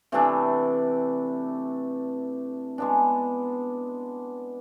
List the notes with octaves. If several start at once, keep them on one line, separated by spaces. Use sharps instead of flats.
C3 E3 A3 D4
G#3 B3 D4